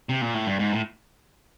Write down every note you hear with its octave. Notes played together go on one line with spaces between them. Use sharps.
C3
A#2
A2
G2
G#2
A2